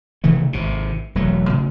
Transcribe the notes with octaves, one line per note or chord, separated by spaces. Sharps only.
C3 D#3 E3 A3
G#1 C3
E1 F#3 A3
A2 C#3